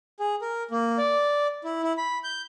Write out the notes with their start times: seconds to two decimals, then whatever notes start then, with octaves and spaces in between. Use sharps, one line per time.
0.20 G#4
0.42 A#4
0.71 A#3
0.98 D5
1.64 E4
1.83 E4
1.97 B5
2.24 G6